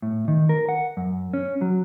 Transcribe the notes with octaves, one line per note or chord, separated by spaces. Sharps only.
A2
D#3
A#4
F#5
F#2
C#4
F#3